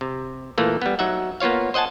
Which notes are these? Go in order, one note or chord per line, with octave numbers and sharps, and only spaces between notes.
C3
A#2 E3 A3 A#3
G3 B3
F#3 D#4 E5 F#5
A#3 B3 F4 C#5 F5
C5 D#5 F#5 G#5 A5